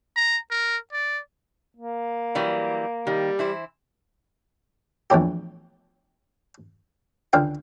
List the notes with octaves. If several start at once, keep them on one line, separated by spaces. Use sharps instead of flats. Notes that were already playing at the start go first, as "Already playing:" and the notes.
A#5
A#4
D5
A#3
E3 F#3 G3
D#3 G3
E3 E4 C5
A#1 E2 A2 G4
C#2 D3 F5 G5